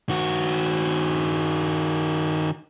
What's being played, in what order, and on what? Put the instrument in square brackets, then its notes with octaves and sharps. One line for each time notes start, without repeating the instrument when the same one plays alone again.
[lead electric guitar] D#3 F#4